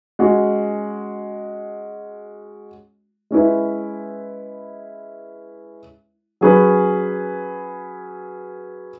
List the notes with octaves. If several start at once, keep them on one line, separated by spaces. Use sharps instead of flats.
G#3 C#4 F#4
G#3 C#4 E4 B4
F#3 C#4 G#4 B4